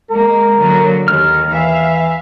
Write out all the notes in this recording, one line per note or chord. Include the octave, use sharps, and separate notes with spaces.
G#3 A#3 A#4
D3 F#3 A#3
D#2 D#3 F6
E3 E5 F5